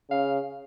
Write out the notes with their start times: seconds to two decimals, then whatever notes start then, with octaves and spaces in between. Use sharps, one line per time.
0.10 C#3 F5